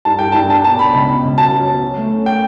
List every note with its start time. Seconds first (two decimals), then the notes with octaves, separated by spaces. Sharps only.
0.05 G2 A5
0.19 G2 G5
0.32 G2 A5
0.49 D4 A5
0.64 B2 A5
0.79 B2 B5
0.93 C#2 B5
1.08 B2
1.23 C#2
1.37 F#3 A5
1.52 F#3
1.66 B3
1.82 C#4
1.96 A3
2.12 C#4
2.26 G5